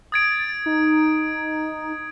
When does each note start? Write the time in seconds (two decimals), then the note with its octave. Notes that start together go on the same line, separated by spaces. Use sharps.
0.12 D#6 G#6 A6 D7
0.66 D#4